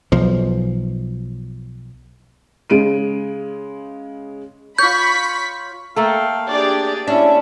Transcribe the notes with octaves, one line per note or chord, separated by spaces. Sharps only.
B1 F3
C#3 G#3 D7 D#7
F4 C#5 B5 C#6 G6 B6
A3 A#3 A4 F5 G5
D4 G4 G#4 D5
C#4 D4 E4 E5